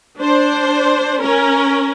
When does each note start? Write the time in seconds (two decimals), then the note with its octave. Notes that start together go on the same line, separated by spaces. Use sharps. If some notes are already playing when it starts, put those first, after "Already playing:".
0.19 D4 C5
1.21 C#4 A#4